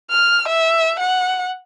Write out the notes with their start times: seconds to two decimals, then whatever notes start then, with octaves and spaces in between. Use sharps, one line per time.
0.11 F6
0.49 E5
1.00 F#5